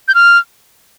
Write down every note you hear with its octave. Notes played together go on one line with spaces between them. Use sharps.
G6
F6